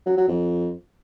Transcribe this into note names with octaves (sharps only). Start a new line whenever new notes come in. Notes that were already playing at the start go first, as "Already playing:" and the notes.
F#3
F#3
F2